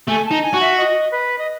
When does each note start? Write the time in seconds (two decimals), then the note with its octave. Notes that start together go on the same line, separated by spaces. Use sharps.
0.08 A3 G#5
0.26 A5
0.31 D#4
0.42 G#5
0.54 F#4
0.61 E5
0.77 D#5
1.12 B4
1.38 D#5